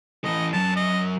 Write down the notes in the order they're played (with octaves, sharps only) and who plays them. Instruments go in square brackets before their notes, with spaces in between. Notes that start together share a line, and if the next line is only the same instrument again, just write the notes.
[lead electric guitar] E3 A4 [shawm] D#5
[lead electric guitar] F#2 F#3 [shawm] A5
[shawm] D#5